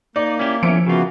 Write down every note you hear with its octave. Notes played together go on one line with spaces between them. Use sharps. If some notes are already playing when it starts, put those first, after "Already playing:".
A#3 D#4 D5
C#4 E4 G4
E2 F3 C#4 E5 C#7 D7
C#3 A#3 B3 F4 F#4